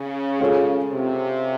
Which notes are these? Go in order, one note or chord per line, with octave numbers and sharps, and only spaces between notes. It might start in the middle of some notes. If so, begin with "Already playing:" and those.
Already playing: C#3
G#3 C#4 F4 A4 C#5
C3